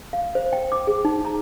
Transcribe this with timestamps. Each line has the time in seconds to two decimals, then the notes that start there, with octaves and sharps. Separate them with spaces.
0.13 F5
0.35 C5
0.53 G5
0.72 D6
0.87 G#4
1.05 D#4
1.25 A#5